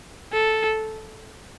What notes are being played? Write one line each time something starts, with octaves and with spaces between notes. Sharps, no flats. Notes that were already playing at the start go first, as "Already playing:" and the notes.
A4